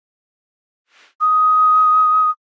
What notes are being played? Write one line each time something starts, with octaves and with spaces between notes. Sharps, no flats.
D#6